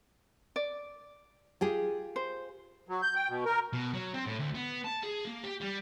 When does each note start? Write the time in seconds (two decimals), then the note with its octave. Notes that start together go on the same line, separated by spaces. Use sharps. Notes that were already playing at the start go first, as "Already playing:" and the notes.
0.56 D5
1.61 F4 G4 G#4
2.16 C5
2.89 F#3
3.02 G6
3.15 G5
3.29 B2
3.45 A#4
3.73 B2
3.94 F#3
4.14 C4
4.26 A2
4.39 D2
4.54 B3
4.84 A5
5.03 G#4
5.25 A#3
5.44 G4
5.61 G3